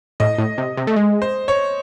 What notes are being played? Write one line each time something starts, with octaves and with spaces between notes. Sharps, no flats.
A2 D#5
A2
C3
C3
A3
G#3
C5
C#5